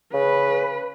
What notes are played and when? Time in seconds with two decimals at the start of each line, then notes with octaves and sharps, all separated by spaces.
0.14 C#3 B4